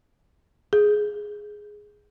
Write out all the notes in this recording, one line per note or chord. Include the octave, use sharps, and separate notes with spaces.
G#4